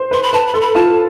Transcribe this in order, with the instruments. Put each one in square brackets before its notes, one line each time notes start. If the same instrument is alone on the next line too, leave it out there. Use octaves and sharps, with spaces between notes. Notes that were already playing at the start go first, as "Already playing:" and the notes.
Already playing: [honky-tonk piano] C5
[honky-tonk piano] B4 [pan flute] C6
[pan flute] B5
[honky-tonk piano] B4 [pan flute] A5
[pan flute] B5
[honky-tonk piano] A4 [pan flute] C6
[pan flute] B5
[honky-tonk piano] F4 [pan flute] A5